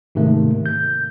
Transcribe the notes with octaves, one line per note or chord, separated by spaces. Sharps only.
G#2 C3 D#3 A3 A#3
G6